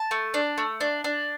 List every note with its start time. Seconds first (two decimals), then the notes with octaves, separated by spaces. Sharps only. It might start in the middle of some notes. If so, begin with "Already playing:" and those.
Already playing: A5
0.11 A3
0.34 D4
0.58 A3
0.81 D4
1.04 D4